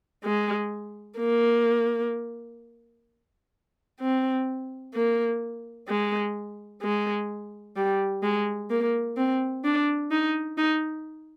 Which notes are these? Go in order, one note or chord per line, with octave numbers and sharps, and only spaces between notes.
G#3
A#3
C4
A#3
G#3
G#3
G3
G#3
A#3
C4
D4
D#4
D#4